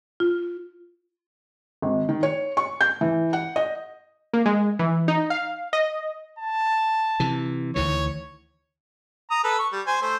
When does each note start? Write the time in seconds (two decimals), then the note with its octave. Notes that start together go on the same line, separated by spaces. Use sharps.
0.20 F4
1.82 G#1
2.09 D#3
2.23 C#5
2.57 C#6
2.81 G6
3.01 E3
3.33 F#5
3.56 D#5
4.33 A#3
4.46 G#3
4.79 E3
5.08 D#4
5.30 F5
5.73 D#5
6.39 A5
7.20 C3 E3
7.76 D2 D#3 E3 C#5
9.31 A#5 D#6
9.44 A4 B4
9.59 C#6
9.72 G3
9.87 C5 G#5
10.02 A3 C5